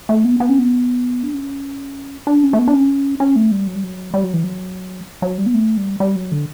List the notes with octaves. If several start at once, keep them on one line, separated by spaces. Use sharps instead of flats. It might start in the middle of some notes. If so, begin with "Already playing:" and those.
A3
B3
B3
C#4
B3
D4
C#4
D4
C#4
A3
B3
D4
C#4
C#4
A3
G3
F#3
G3
F#3
G3
F#3
E3
F#3
F#3
G3
B3
A3
G3
G3
F#3
D3